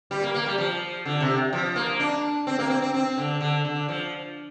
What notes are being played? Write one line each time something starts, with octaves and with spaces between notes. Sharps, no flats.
G3
A#3
A#3
G3
F3
D3
C3
F3
A#3
D4
C4
A#3
C4
C4
C4
D3
D3
D3
F3